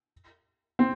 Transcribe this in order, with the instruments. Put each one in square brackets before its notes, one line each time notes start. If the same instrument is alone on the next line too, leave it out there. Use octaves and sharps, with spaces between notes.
[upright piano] C4